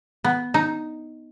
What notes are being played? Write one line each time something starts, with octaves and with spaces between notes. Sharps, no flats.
B3
D#4